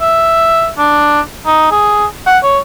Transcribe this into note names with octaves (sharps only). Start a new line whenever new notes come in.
E5
D4
D#4
G#4
F#5
C#5